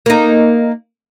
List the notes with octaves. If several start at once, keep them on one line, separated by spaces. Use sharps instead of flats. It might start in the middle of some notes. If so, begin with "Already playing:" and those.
A#3 D#4